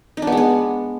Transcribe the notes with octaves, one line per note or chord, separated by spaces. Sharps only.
D#4
D4
B3
G#3
B3